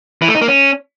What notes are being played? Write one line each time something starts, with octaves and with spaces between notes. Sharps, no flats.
E3
A3
D#4
A#3
C#4